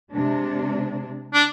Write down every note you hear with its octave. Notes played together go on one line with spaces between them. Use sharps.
C3 G#3 D4
D4